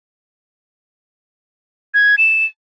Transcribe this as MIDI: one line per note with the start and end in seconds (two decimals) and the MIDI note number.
1.94 2.16 92
2.18 2.44 100